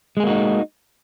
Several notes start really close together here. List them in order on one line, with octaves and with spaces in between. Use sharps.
G#3 G#4 A#3 F#4 D#4